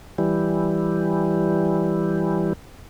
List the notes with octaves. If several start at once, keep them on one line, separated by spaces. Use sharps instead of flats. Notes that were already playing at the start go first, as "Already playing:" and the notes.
E3 G3